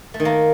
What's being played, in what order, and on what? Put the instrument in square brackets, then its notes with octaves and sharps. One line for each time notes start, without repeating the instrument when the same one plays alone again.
[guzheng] A3
D#3
A#3